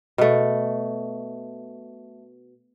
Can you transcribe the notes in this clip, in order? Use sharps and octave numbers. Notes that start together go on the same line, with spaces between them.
B2 A3